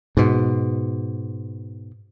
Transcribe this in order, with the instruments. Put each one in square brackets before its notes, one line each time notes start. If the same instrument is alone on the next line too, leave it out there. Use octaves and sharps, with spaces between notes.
[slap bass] G#2 B2